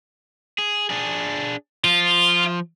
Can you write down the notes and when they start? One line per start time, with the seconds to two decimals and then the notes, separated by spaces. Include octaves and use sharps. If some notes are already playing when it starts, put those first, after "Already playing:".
0.58 G#4
0.90 D4 G#4
1.84 F3 F4